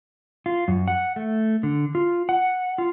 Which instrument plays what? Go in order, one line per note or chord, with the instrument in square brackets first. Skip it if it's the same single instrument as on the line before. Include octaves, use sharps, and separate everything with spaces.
[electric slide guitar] F4
F#2
F#5
A3
D3
F4
F#5
F4